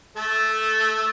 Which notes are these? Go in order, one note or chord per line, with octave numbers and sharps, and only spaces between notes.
A3 A4